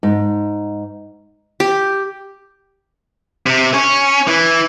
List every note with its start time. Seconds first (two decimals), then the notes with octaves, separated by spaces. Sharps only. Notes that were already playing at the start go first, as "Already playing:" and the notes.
0.03 G#2
1.60 G4
3.46 C3
3.74 C#4
4.28 E3